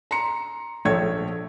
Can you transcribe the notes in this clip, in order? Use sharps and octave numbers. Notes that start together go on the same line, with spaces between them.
A#5 C6 C#7
A#1 A4 C#5 G#6